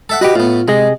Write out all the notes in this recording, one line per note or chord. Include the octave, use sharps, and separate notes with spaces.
A4 E5 F#5
F#4 G4 B4 D#5 F#5
A2 B3 F4
C3 G#3 G#4 D#5